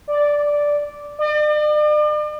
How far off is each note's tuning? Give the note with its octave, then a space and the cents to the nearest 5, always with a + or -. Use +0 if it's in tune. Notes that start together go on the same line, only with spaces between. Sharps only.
D5 -5
D5 +40